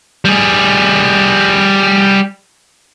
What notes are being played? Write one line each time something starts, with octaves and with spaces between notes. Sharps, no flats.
G3 G#4